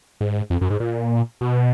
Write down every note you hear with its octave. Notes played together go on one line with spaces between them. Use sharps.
G#2
F2
F#2
G#2
A#2
B2